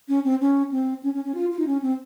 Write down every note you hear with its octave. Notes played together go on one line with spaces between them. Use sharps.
C#4
C4
C#4
C4
C#4
C#4
C#4
F4
F4
D#4
C#4
C4